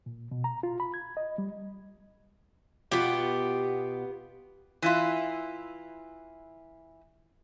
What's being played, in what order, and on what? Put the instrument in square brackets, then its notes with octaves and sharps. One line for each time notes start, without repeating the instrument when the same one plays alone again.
[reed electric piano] A#2
B2
A#5
F4
B5
G#6
D#5
G3
[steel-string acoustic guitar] B2 F4 [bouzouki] B3 G4
[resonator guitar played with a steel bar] E3 E4 F4